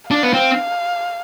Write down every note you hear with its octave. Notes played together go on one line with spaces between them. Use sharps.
D4 F5
B3
C4